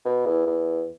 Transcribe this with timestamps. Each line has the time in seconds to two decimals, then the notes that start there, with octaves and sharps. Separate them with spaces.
0.05 B2
0.26 E2
0.46 E2